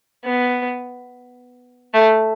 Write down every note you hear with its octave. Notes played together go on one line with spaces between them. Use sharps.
B3
A3